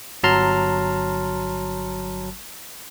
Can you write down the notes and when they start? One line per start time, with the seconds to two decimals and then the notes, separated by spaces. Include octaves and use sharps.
0.23 G1 F#3 A5 A#5 C6 F6